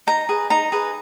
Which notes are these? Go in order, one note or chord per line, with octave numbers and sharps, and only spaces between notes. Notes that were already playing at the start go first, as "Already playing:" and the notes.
D#4 A#5
G#4 B4
D#4 A#5
G#4 B4